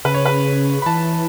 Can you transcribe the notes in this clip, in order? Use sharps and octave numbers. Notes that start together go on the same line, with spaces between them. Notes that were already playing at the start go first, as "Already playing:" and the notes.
C#3 B4
C#5
B4
B5
E3 A5